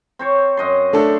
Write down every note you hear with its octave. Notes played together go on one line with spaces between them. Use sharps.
C4 C5 C#5
F#2 D#5 C6
A3 D4 A4